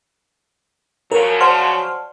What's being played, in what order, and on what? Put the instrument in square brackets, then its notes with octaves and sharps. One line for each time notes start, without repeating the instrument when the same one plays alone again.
[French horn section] C#3 F3 F#3 [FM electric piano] A#4
[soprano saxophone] C5 [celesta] D5 F#5 A5 [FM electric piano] C6 F6